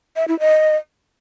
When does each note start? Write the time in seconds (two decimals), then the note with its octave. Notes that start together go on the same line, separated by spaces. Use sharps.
0.16 E5
0.28 E4
0.40 D#5